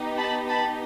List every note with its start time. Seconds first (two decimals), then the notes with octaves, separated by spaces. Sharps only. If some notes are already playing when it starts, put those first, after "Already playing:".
Already playing: B3 D#4 G4
0.17 A5 B5
0.48 A5 B5